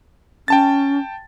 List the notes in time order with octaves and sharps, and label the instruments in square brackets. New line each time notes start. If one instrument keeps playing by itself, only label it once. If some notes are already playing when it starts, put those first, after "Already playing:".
[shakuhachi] C#4 [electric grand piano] G5 A5 A6